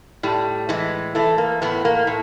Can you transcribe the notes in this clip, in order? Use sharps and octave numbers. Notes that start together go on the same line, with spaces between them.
A2 G3
E3 G#3
E3 A3
A#3
A2 B3
A#3
A2